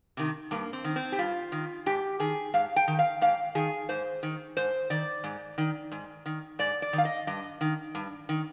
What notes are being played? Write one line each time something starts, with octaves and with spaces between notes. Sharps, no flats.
C3 D#3
G2 A#3
C4
D#3
C4
G4
G2 F4
D#3
G#2 G4
D#3 G#4
G#2 F5
G5
D#3
F5
G#2 F5
D#3 G#4
G#2 C5
D#3
G#2 C5
D#3 D5
G#2
D#3
G#2
D#3
G#2 D5
D5
D#3
F5
D#5
G2 D#5
D#3
G2
D#3